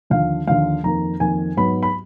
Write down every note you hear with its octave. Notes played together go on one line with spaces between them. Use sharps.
D#2 D3 F3 F5
D#2 D3 F3 F5
F2 D#3 A#3 A#5
F2 D#3 A#3 G#5
G#2 F#3 B3 B5
B5